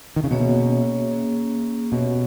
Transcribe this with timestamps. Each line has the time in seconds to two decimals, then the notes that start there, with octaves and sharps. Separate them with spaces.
0.16 D#3
0.24 C#3
0.31 B2 A#3 C#4 G#4 C#5 E5
1.11 A#3 C#4 G#4
1.92 B2 B3 G4 C#5 E5